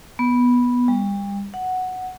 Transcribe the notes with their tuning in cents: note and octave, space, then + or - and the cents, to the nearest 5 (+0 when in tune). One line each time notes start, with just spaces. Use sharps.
B3 -10
G3 +35
F#5 +0